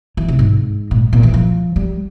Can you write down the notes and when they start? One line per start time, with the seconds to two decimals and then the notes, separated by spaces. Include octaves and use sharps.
0.17 E3
0.28 C3
0.39 G#2
0.91 A#2
1.13 A#2
1.23 E3
1.34 F3
1.76 G3